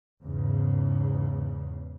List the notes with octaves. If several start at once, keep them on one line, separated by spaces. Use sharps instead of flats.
E2 G#2 C#3